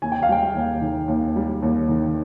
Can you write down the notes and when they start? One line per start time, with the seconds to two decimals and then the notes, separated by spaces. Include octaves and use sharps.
0.02 D#2 G#5
0.12 G5
0.23 F5
0.29 G3 G5
0.55 D#2
0.82 D#3
1.08 D#2
1.36 G3
1.62 D#2
1.89 D#3